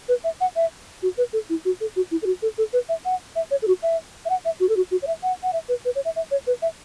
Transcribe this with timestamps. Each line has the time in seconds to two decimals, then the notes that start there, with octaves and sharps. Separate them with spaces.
0.08 B4
0.24 E5
0.41 F#5
0.56 E5
1.02 F#4
1.18 B4
1.33 A4
1.49 E4
1.65 F#4
1.81 A4
1.96 F#4
2.11 E4
2.22 A4
2.26 F#4
2.42 A4
2.58 A4
2.73 B4
2.89 E5
3.05 F#5
3.36 E5
3.51 C#5
3.62 A4
3.67 F#4
3.82 E5
4.25 E5
4.30 F#5
4.45 E5
4.60 F#4
4.69 A4
4.76 F#4
4.91 F#4
5.02 C#5
5.07 E5
5.23 F#5
5.43 F#5
5.53 E5
5.69 B4
5.85 B4
5.95 C#5
6.05 E5
6.16 E5
6.31 C#5
6.47 B4
6.62 E5